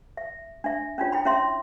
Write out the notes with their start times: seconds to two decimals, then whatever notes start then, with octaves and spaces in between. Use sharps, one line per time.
0.17 E5
0.64 D4 E5
0.98 C#4 D4 F4 C#5
1.12 E4 G5 B5
1.25 C#4 E4 C#5 E5 C6